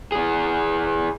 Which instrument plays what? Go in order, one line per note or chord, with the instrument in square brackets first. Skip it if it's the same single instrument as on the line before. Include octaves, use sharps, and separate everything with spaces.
[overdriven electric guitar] E3 G#4